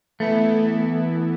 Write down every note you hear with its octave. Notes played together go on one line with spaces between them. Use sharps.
E3 A3 B3 E4